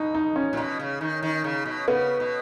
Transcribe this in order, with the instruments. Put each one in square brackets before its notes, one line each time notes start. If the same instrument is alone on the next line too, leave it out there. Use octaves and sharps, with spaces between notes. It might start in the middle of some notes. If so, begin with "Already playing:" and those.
Already playing: [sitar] B2 [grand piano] D#4
[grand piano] D#4
C#4
[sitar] A#2
B2
C#3
D#3
D#3
C#3
B2
[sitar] C#3 [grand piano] B3
[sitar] B2